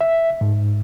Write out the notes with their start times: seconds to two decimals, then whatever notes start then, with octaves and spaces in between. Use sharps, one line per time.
0.01 E5
0.41 G#2